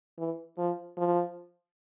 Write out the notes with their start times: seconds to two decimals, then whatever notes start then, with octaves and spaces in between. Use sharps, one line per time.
0.19 E3
0.58 F3
0.97 F3